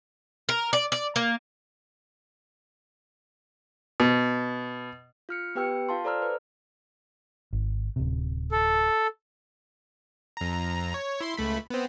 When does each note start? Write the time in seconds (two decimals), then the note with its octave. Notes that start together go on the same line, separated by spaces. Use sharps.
0.49 A#4
0.73 D5
0.92 D5
1.16 A#3
4.00 B2
5.29 F4 F6 C#7
5.55 B3 G4 B4 G5 E6 C#7
5.89 F4 F5 A5 C6
6.04 A4 C5 D5 A#5 E6 F6
6.22 B4
7.53 G#1
7.96 D1 C3
8.51 A4
10.37 F2 A#5
10.94 C#5
11.21 E4 C6 C7
11.37 C#2 A3 B5
11.70 B3 C4